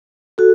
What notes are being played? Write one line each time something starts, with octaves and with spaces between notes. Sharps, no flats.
F#4 A4